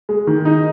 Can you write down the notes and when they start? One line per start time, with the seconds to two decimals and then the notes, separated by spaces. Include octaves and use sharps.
0.09 G#3
0.27 D#3
0.45 D#4